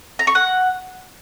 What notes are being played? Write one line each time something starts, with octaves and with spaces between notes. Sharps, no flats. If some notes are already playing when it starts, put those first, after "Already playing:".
A#5
C#6
F#5